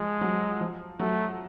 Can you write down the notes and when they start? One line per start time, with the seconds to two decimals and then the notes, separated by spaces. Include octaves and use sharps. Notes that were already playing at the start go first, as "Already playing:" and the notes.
Already playing: F3 G#3
0.21 F#3
0.61 F3
0.99 F#3 A3